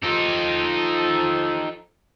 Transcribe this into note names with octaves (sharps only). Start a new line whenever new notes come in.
F3 D#4 F4 G4 A4